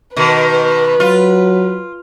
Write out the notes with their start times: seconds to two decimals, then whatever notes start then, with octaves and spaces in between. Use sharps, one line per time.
0.17 B2 D#3 B4
1.00 F#3 F4